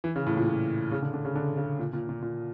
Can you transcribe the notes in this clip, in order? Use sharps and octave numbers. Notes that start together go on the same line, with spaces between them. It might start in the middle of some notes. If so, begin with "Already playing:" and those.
E3
C#3
A2
A#2
A#2
C#3
D3
D3
C#3
D3
C#3
A#2
A#2
A#2
A#2